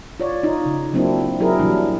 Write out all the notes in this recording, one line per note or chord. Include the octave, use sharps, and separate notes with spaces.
F4 C#5 D5
D#4 F4
C#3
F#3 A#3 C4 D4 E4
F#3 E4 G#4 A#4
A#2 E3 F#3 G3 D4